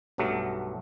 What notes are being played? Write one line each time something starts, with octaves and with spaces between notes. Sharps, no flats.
B1 G2 F#3 A3